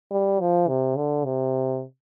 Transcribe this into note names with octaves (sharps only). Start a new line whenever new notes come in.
G3
F3
C3
D3
C3